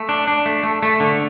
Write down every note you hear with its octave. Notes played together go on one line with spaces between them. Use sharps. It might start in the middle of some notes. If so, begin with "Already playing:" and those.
Already playing: A3
D4
D4
A3
A3
A3
D3